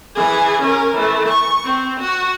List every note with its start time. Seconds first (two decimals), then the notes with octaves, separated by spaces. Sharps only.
0.15 E3 G#4
0.62 C#4 A#4
0.95 E3 A3
1.28 C#6
1.64 C4
2.00 F#4